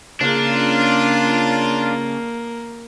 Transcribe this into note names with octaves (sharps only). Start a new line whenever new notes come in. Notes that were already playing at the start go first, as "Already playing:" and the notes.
C#3 A#3 D4 F4